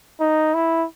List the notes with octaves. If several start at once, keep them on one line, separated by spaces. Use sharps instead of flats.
D#4
E4